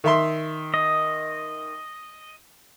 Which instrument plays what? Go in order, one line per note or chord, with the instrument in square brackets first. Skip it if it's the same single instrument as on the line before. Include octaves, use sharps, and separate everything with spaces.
[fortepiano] D#3 E5 C6
[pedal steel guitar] D#5